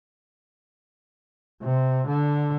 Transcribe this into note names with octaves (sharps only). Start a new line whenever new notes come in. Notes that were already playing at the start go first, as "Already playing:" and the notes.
C3
D3